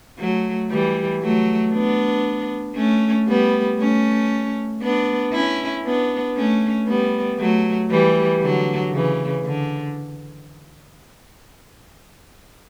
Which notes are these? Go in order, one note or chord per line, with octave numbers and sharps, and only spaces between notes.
F#3 A3
E3 G3
F#3 A3
B3 D4
A3 C#4
G3 B3
A3 C#4
B3 D4
C#4 E4
B3 D4
A3 C#4
G3 B3
F#3 A3
E3 G3
D3 F#3
C#3 E3
D3